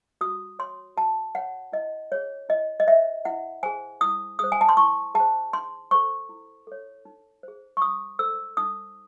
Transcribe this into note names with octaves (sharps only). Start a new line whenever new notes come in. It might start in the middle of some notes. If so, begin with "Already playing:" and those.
F#4 D#6
C#5 C6
F#4 A5
C#5 F#5
E4 D#5
G#4 C#5
E4 D#5
D#5
C5 E5
E4 F#5
G#4 C5 G#5
E4 D#6
G#4 C5 D#6
G#5
A5
C6
E4 C#6
G#4 A5
C5
D#4 C6
A4 C5 C#6
E4
A4 C#5
D#4
G#4 C5
C#6
D#4 D#6
A4 C5 E6
D#4 D#6